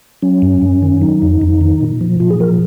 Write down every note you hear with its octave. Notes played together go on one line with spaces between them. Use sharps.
F#3 C#4
F#2
F#2
D#3
F#3 D#4
F2
F2
D#3
A#2
F3
A#2 F4
G#4
F3 A#4